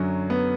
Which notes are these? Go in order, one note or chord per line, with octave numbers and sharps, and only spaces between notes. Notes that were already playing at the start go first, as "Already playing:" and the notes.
Already playing: F#2 D3 F#3
B3